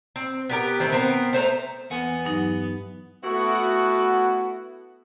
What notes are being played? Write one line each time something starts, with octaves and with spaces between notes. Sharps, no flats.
C4
B3 G4 A#4
D#3 E3 A3 C4
B3 C4 A#4
A3 C5 G#5 A#5
E2 B3 F#5 G#5
G2 F#3 D#4
A3 B3 E4 F#4